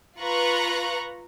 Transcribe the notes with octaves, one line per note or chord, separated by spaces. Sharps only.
F4 B4 A#5 C#6 F#6